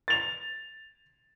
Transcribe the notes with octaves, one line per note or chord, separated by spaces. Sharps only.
A6 F7